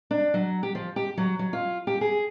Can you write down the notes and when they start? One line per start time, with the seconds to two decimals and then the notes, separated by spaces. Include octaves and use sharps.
0.11 D4
0.34 F#3
0.63 G4
0.75 F3
0.96 G4
1.17 F#3
1.39 F#3
1.53 F4
1.87 G4
2.01 G#4